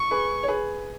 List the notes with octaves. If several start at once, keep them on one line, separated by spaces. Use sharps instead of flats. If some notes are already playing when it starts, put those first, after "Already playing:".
Already playing: C#6
G#4 B4
C#5
G#4 B4